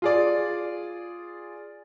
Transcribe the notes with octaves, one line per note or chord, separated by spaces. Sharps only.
F4 G#4 D5